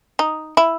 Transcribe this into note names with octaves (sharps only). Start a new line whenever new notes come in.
D#4
E4